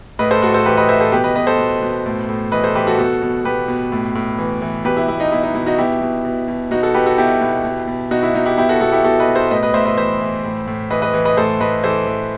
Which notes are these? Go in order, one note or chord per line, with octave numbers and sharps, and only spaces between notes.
A2 B4 D#5
A4 C5
A2 F#4 A4
A4 C5
E3 G4 B4
B4 D#5
E3 C5 E5
A4 C5
B2 G4 B4
B4 D#5
B2 B4 D#5
A4 C5
B2
B2
A2
A2
E3 B4 D#5
A4 C5
E3 G4 B4
F#4 A4
B2 F#4 A4
B2
B2 G4 B4
B2
A2
A2
E3
E3
B2 G4 B4
E4 G4
B2 E4
D#4
B2 E4
D#4
B2 E4
D#4 F#4
B2 E4 G4
B2
B2
B2
B2 D#4 F#4
F#4 A4
B2 G4 B4
F#4 A4
B2 E4 G4
B2
B2
B2
B2 D#4 F#4
E4
B2 D#4
E4 G4
B2 E4 G4
F#4 A4
B2 F#4 A4
E4 G4
B2 F#4 A4
B4 D#5
B2
A4 C5
A2 B4 D#5
B4 D#5
A2 C5 E5
B4 D#5
E3 C5 E5
E3
A2
A2
E3 B4 D#5
B4 D#5
E3
B4 D#5
A2 A4 C5
A2 B4 D#5
E3 A4 C5
E3